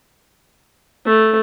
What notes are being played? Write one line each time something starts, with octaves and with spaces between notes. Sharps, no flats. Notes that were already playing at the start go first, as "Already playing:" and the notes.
A3